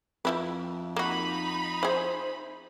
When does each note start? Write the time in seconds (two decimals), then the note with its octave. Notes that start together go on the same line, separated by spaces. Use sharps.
0.25 F2 F3 E4 B4
0.96 A#3 D#4 F#4 B5
1.83 E4 G#4 C5